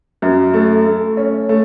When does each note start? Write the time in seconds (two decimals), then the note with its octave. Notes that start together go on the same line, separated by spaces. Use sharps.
0.22 F#2
0.54 A3
0.86 A3
1.17 C#4
1.49 A3